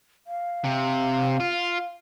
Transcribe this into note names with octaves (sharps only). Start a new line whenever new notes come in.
F5
C3
F4